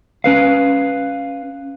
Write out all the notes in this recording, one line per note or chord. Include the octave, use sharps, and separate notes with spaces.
C#4 B4 F5